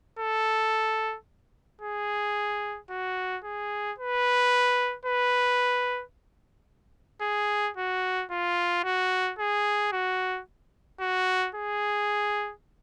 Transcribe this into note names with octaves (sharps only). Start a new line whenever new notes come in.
A4
G#4
F#4
G#4
B4
B4
G#4
F#4
F4
F#4
G#4
F#4
F#4
G#4